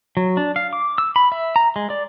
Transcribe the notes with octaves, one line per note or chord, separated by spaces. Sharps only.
F#3
D4
F5
D6
E6
B5
E5
A#5
G#3
D5